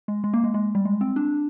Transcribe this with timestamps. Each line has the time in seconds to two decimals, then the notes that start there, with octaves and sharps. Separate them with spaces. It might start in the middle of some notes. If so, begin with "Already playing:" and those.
0.08 G#3
0.24 G#3
0.34 A#3
0.44 G#3
0.54 G#3
0.75 G3
0.85 G#3
1.01 C4
1.16 D4